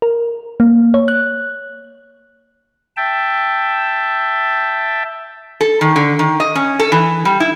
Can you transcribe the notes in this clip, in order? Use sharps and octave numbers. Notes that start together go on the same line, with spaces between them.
A#4
A#3
C#5
F#6
E5 G5 A5
A4
D#3
D3
D#3
D#5
C#4
A4
E3
G3
E4